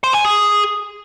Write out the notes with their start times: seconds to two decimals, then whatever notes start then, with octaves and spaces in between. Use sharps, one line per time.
0.04 C5
0.14 G#5
0.25 G#4